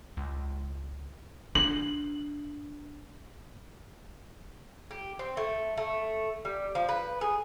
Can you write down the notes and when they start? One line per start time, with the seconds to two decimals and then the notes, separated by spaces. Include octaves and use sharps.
0.17 C#2
1.55 D4 F#7
4.91 G4
5.19 C4
5.37 A3
5.77 A3
6.45 G3
6.75 F3
6.89 B4
7.21 G#4